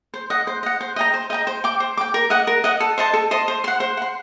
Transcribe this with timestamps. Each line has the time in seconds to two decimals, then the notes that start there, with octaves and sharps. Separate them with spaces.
0.14 C5
0.30 D#5 F#5
0.47 C5
0.63 D#5 F#5
0.81 C5
0.96 D#5 G5 A#5
1.14 C5
1.30 D#5 G5 A#5
1.47 C5
1.64 G5 D6
1.80 C5
1.97 G5 D6
2.14 A#4
2.30 D#5 F#5
2.47 A#4
2.64 D#5 F#5
2.80 A4
2.98 C5 D#5 A5
3.13 A4
3.31 C5 D#5 A5
3.48 C5
3.64 F#5 C6
3.80 C5
3.97 F#5 C6